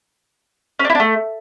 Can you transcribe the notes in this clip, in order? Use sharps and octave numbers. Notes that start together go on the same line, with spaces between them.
C#4
D4
E4
D4
A3